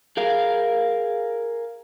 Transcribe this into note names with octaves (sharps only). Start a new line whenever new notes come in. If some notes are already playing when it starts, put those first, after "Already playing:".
G#4 A#4 F5